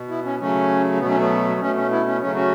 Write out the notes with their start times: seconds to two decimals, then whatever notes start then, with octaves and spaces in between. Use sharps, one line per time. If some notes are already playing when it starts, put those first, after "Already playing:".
Already playing: B2
0.09 B3 E4
0.25 C#4
0.40 C#3 F#3 A3 C#4
1.00 B2 F#3 A3 B3
1.10 C#4
1.21 B3
1.61 B2 A3 C#4
1.76 C#4
1.91 B3 E4
2.07 C#4
2.21 C#3 F#3 A3 C#4
2.36 C#4 F#4